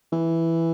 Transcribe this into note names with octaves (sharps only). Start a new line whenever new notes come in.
E3